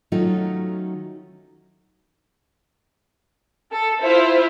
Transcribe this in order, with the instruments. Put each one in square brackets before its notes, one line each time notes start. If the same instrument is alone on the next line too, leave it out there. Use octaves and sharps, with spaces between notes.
[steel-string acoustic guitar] D#3 F#3 A3 C#4 D#4 F4
[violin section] A4
E4 F4 C5 E5